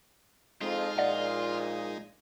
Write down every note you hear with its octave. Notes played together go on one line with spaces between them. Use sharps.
F2 G#3 D#4 F4
A#1 A#2 D5 D#5 F#5